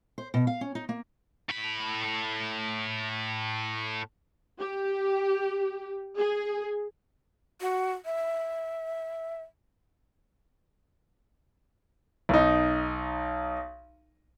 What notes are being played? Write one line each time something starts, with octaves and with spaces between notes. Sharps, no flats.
C5
B2
F5
C#4
D#4
A#3
A2 B5
G4
G#4
F#4
E5
B1 D#4